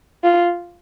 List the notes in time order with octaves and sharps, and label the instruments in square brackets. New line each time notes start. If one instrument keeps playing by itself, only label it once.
[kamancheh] F4